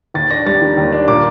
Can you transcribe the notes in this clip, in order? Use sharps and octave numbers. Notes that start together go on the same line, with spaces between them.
D#2 A6
D4 A#6
G3 A6
D#3
D#2
D4
A#2 D6